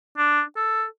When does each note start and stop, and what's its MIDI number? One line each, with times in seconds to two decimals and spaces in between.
0.18 0.42 62
0.56 0.84 69